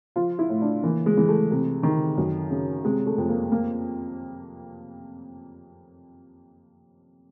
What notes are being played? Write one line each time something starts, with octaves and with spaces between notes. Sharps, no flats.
F3 F4
E4
A2
D4
E3 A#3
G#3
E3
A3
C3
D#3
F#2
C#3
C3 G#3
A3
F2
A#3
A#3